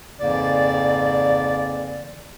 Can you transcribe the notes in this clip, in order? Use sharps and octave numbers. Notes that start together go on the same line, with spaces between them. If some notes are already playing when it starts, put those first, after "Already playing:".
F2 G#2 C#3 E3 A#3 D5